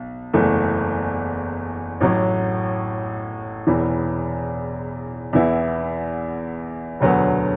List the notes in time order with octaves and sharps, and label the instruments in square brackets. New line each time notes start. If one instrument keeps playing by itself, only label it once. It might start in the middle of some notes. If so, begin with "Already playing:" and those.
Already playing: [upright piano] B1
F#1 E2 E3 A3
A1 A2 F#3
E1 E2 E3
E2 E3 B3 E4
E1 D2 D3 F#3 B3